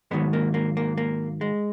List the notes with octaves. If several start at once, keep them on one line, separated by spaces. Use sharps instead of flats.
G#2 D#3 F#3 G#3 B3
A#3
A#3
A#3
A#3
G#3